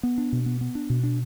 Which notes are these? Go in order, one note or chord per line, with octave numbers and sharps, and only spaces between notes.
B3
D4
B2
B3
B3
D4
B2
D4